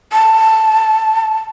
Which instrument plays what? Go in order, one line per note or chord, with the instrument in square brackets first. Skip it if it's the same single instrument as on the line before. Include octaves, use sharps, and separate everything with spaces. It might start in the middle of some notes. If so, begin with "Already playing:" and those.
[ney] A5